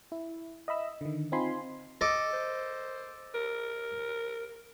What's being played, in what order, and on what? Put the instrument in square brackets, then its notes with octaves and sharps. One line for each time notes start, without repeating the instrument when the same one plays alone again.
[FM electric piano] E4
D#5 E5 B5 E6
D3 D#3
C4 D#4 F4 G#5 B5 C6
[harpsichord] A4 D#5 D6
[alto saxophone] C5
A#4